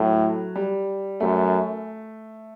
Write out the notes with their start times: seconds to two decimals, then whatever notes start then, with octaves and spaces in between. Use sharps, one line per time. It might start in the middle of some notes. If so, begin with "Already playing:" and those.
Already playing: A2 F#3
0.55 G3
1.20 F#2 A3